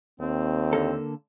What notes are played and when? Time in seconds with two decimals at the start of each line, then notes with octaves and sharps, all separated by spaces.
0.20 D#2 C4
0.73 D3 A#3 A4